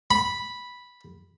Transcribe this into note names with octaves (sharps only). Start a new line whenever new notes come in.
B5